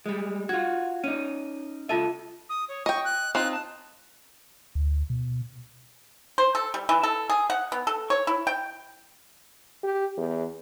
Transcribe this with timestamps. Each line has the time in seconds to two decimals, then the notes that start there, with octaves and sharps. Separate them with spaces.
0.06 G3 G#3
0.49 F4 F#4 G#6
1.04 C#4 D#4 D#7
1.89 C#2 F4 A4 E5 A5 D#7
2.49 D#6
2.69 C#5
2.86 D#5 G5 C#6
3.05 F#6
3.35 C4 D#4 F4 F#6
3.52 A5
4.75 D2
5.10 B2
6.38 C5
6.55 A4
6.74 G3
6.89 E3
7.03 A4
7.30 G#4
7.50 F#5
7.72 B3
7.87 A4
8.10 C#5
8.27 E4
8.47 G5
9.84 G4
10.17 E2